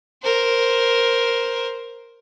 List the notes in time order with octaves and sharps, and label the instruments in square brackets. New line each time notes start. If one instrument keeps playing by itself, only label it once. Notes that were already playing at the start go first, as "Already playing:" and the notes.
[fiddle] A#4 C5